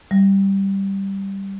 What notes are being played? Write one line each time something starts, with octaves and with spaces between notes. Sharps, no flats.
G3